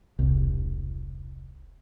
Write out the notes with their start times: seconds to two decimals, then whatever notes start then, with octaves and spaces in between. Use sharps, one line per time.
0.19 E1 C2